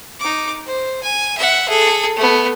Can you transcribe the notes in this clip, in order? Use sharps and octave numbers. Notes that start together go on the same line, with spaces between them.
D#4 D6
C5
G#5
E5 F#5
G#4 A4
A3 B3